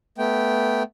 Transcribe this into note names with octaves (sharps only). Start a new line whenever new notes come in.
A3 B3 G5